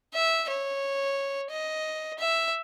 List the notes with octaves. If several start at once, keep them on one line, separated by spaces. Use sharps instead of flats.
E5
C#5
D#5
E5